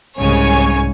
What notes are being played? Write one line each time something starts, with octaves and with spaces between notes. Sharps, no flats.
C2 G#2 C#3 C#5 G#5